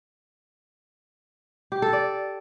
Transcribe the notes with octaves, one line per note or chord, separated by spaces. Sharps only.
G4
A4
D5